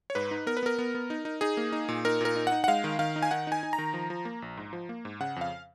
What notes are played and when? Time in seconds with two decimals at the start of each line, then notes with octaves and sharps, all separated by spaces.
0.10 C#5
0.15 G#2 B4
0.31 D#4
0.46 B3 A#4
0.57 B4
0.63 B3 A#4
0.78 B3
0.95 B3
1.10 D#4
1.25 D#4
1.41 D#4 G#4
1.57 A#3
1.72 D#4
1.89 A#2
2.05 D#4 A#4
2.21 A#2 A#4
2.36 D#4
2.47 D#4 F#5
2.64 F#5
2.68 G#3 F5
2.84 D#3
2.99 D#3 F5
3.16 D#4
3.22 G#5
3.31 D#3 F#5
3.47 D#4 G#5
3.63 D#4
3.73 A#5
3.78 D#3
3.94 F3
4.10 F3
4.25 A#3
4.42 A#1
4.57 G#2
4.73 F3
4.89 A#3
5.05 G#2
5.20 C#3 F#5
5.36 F2 F5